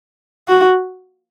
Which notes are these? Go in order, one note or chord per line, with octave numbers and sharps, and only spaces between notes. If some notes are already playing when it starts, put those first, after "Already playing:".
F#4